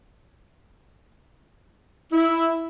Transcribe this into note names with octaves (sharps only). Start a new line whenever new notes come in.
E4